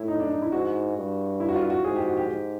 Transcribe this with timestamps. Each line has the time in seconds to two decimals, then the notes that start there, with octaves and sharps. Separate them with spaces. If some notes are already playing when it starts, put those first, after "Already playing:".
Already playing: A2 E4
0.08 D#4
0.20 D4
0.30 D#4
0.42 E4
0.52 G#2 F#4
0.97 G2
1.40 E4
1.49 F#4
1.55 F4
1.70 F#4
1.84 G#2 G#4
1.96 G4
2.06 F#4
2.17 G4
2.29 G#2